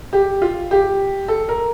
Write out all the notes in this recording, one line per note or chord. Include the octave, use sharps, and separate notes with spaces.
G4
F4
G4
A4
A#4